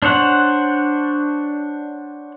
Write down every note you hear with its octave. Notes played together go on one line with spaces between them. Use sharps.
D4 C5 C#5 F#5